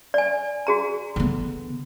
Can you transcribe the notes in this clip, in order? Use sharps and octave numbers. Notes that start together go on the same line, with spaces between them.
D5 G#5
F#4 G#4 A#5
D3 B3